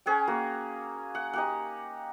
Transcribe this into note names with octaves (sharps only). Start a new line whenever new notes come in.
C#4 G#4 F#5 G5
A#3 F#4
F#5
D#4 G4 F#5